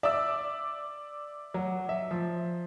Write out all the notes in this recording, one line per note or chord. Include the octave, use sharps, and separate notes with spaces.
D5 E5 E6
F#3
E5
F3